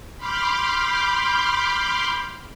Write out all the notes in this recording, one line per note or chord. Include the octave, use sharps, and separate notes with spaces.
B5 C6 D6 F6 G6